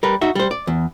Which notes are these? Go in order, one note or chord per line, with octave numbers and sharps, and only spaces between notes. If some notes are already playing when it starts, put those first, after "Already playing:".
G3 A#4 B4
D#4 F#4 E5
G3 C5
D5
E2